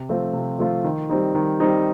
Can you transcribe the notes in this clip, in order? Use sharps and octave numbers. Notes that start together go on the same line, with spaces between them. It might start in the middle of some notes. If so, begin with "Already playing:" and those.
Already playing: C3
F3 A3 C4 F4
C3
F3 A3 C4 F4
D#3
G3 C4 D#4
D#3
G3 C4 D#4